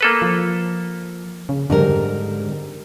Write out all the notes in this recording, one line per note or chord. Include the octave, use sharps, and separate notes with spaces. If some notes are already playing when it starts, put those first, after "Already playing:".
A#3 A4 B4
F3
C#3
G#2 D3 G3 A#4